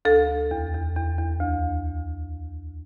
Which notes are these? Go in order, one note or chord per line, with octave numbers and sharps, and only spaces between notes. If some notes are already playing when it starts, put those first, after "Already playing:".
D2 A4
D2
E2
E2
E2
E2
D2